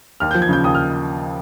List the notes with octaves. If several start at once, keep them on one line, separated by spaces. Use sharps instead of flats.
D#2 F6
F3 G6
G#6
C#3 G6
D#2 D#6
F6